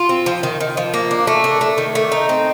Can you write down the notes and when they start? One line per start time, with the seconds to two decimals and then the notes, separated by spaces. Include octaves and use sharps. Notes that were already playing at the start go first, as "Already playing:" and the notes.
Already playing: F4
0.09 C4
0.26 F3
0.43 D#3
0.60 D#3
0.77 F3
0.94 A#3
1.11 D4
1.27 A3
1.44 D4
1.61 A3
1.78 D#3
1.95 A3
2.12 D#4
2.29 C4